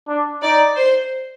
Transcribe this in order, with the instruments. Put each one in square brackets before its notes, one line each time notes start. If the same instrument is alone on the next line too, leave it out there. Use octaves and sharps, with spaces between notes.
[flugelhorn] D4
[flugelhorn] D#4 [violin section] D5
[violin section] C5